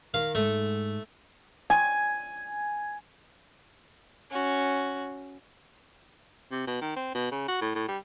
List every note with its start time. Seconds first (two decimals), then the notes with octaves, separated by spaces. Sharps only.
0.14 D#3 F5
0.35 G#2 A3
1.70 G#5
4.30 C#4 F#4
6.52 C3
6.67 B2
6.81 D#3
6.97 C4
7.15 B2
7.32 C#3
7.48 F#4
7.62 A2
7.75 A2
7.88 G3